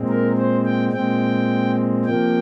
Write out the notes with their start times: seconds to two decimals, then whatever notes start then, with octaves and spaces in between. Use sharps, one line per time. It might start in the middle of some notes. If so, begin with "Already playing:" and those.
Already playing: A#2 G#3 C4
0.09 A#4
0.37 C5
0.65 G5
0.93 A#2 G#3 C4 G5
2.05 C3 F3 A#3 G5